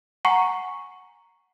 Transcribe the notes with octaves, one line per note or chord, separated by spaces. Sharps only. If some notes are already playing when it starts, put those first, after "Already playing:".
F#5 G#5 A#5 C#6 C7